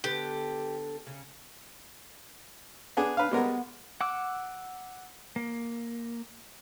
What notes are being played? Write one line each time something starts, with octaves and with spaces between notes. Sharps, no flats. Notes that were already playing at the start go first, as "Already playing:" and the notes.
D3 B3 G4
C#3
B3 D4 G#4
D4 B4 F5
G3 G#3 B3 A#4
F#5 D6 E6
A#3